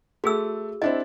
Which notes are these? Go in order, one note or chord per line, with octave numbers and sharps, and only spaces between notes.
A3 F#4 G#4 A4 E6
C4 D4 E4 D#5